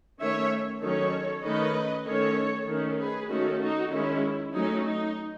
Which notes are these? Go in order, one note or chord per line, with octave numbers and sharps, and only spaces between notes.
D#3 A3 C#4 C#5 E5
D#3 F#3 C#4 A4 C#5
D#3 A3 C#4 B4 D#5
D#3 A3 C#4 A4 C#5
D#3 A3 C#4
G#4 B4
D#3 A3 C#4 F#4 A4
D#4 F#4
D#3 G#3 C#4 E4
F#3 A3 C#4 D#4
D#4